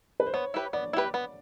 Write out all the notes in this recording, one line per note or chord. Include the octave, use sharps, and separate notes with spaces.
B4
C5
B3 C#5
E4 G4 B4
B3 D5
E4 G4 B4
B3